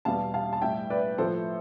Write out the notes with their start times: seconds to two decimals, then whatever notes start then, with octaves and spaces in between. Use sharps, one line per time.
0.05 E2 B2 G3 F5 A5
0.34 F5 A5
0.53 A5
0.62 A2 G3 E5 G5
0.90 B4 D5
1.18 A2 F3 A3 A4 C5